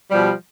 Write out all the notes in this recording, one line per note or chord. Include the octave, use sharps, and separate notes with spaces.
B2 F3 G3